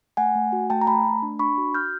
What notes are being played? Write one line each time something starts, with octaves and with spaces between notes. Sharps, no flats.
A3 F#5 G#5
A3
F#4
A3 G5 A5
A#5
A3 A5 B5
A3
D4
D4 B5 C#6
F#4
F#4 F6 G6